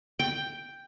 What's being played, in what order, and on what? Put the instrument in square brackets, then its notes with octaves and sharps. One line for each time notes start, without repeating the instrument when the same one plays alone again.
[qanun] G5